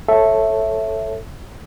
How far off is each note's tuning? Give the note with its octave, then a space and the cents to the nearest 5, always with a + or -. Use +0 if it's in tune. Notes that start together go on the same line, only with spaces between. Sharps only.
A4 +0 C#5 -15 E5 +0